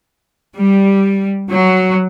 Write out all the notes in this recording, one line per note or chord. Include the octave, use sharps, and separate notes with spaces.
G3
F#3